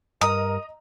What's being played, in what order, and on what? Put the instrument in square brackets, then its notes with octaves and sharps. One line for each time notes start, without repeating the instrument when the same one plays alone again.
[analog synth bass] G2 [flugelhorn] A#4 [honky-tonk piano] D#5 A#5 [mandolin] D#6